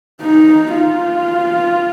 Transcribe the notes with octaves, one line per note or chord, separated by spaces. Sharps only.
D#4
F4